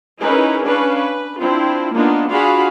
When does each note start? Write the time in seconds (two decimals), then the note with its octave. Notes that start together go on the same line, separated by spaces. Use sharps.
0.21 C#4 D#4 E4 G#4 A#4 B4
0.65 C#4 D4 B4 F5
0.98 B4
1.39 C4 D4 E4 F4
1.93 A#3 B3 D4 D#4 F4
2.28 D4 F4 F#4 G#4 F5 B5